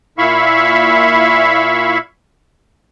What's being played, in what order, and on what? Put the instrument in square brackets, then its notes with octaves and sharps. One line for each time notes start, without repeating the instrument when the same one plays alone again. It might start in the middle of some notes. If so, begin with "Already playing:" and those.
[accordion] A#2 E4 E5 F5 B5 C#6